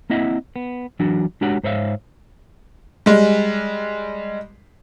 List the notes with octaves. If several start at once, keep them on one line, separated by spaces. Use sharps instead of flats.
A#3 C4 E4 D#5 E5 F#5
B3
E3 F#3 D4 F#4
G#3 D4 F#4 G4 C#5 F#5
G#2 C5 C#5 E5 F5
G3 G#3